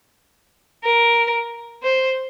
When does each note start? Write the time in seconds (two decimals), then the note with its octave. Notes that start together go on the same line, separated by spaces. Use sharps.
0.84 A#4
1.83 C5